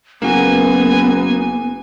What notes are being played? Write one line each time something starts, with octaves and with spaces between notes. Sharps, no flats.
F#1 A#3 B3 F#4 G#5